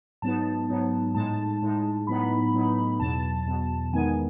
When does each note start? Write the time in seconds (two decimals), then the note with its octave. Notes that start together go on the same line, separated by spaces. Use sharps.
0.22 G#2 F#3 B3 D#4 A5
0.68 G#2 F#3 B3 D#4
1.15 A2 G#3 D#4 A5
1.62 A2 G#3 D#4
2.07 A2 F#3 B3 D#4 B5
2.54 A2 F#3 B3 D#4
3.00 E2 B2 F#3 A5
3.46 E2 B2 F#3
3.93 E2 D#3 G#3 B3 D#4 G#5